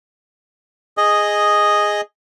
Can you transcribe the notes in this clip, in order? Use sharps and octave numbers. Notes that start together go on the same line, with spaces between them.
G#4 D#5